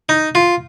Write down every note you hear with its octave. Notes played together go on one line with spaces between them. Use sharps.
D#4
F4